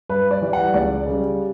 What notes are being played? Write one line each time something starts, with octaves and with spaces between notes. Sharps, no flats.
G2 B4
D5
E3 G3
F#5
C#2 D5
C#3 G3